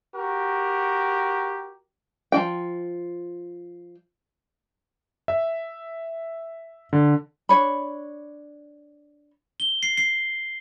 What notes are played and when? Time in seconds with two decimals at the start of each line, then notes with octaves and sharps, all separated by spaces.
0.15 F#4 G4 A#4
2.32 F3 F#4 G5
5.28 E5
6.93 D3
7.49 D4 C#5 B5
9.60 G7
9.83 C7
9.98 C7